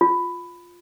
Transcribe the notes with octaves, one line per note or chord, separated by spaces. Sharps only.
F4